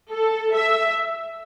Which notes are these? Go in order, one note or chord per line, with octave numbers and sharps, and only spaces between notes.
A4
E5